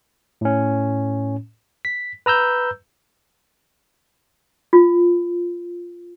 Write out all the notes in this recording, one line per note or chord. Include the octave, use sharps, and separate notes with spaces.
A2 C#4
B6
B4 A#5 E6 G6
F4